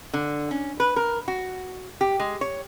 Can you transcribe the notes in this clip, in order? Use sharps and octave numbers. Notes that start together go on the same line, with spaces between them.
D3
C#4
B4
A#4
F#4
G4
G#3
C#5